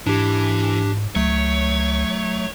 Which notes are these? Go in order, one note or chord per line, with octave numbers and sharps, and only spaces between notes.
G#2 E3 D4 G4
C#2 F#3 A3 C#5